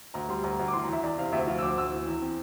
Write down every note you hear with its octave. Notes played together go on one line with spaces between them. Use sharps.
D2 A#5
G3 C6
D2 A#5
D2
D6
E3 C6
A#5
E2 E5
E2 D5
C3 F5
D2 E5
F3 F5
E6
D2 D6
D2 E6
E3
E2
C4